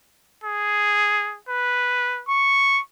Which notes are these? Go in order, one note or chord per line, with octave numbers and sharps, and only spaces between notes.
G#4
B4
C#6